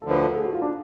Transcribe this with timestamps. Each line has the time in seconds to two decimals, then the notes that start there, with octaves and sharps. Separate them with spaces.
0.02 D2 D3 F3 A4
0.11 B4
0.20 A4
0.36 G#4
0.45 F#4
0.53 F4
0.62 D4